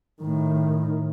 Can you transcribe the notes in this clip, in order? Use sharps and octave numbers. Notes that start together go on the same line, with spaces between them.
A2 D#3